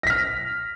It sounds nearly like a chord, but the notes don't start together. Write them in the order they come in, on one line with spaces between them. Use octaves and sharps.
A#6 B6 F6